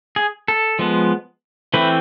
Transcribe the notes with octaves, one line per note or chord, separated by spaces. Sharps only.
G#4
A4
F3 G#3 B3
E3 A3 C4 B4